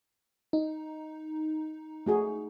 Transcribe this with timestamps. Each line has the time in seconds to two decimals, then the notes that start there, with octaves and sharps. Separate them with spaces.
0.53 D#4
2.06 A3 F#4 G#4